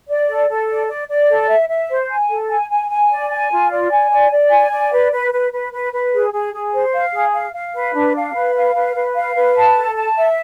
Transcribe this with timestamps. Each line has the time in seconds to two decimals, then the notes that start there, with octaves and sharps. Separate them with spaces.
0.08 D5
0.29 A4
0.49 A4
0.69 D5
0.89 D5
1.09 D5
1.29 A4
1.49 E5
1.69 E5
1.89 C5
2.10 G#5
2.30 A4
2.50 G#5
2.70 G#5
2.90 G#5
3.10 D5
3.30 G#5
3.51 F4
3.71 D5
3.91 G#5
4.11 D5
4.32 D5
4.51 G#5
4.71 D5
4.92 B4
5.12 B4
5.32 B4
5.52 B4
5.73 B4
5.93 B4
6.13 G#4
6.32 G#4
6.53 G#4
6.73 C5
6.93 F5
7.13 G#4
7.34 F5
7.53 F5
7.74 B4
7.94 D4
8.14 F5
8.34 B4
8.54 F5
8.75 B4
8.95 B4
9.15 F5
9.36 B4
9.55 A5
9.76 A4
9.96 A5
10.16 E5